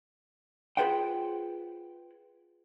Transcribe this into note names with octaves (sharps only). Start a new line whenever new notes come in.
F4 G#4 B4 C5 F#5 G5